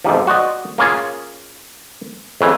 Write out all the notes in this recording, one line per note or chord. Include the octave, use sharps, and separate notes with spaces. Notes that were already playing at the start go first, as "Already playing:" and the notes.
B1 G#2 C3 F3
F#4 C5 D5 D#5
A#3 C#4 F4 G#4
F2 C#3 E3